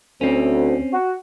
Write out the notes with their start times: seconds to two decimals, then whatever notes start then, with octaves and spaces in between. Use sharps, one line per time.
0.21 D2 C4 C#4
0.93 F#4